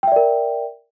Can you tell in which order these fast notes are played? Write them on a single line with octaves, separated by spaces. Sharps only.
G5 E5 D5 A#4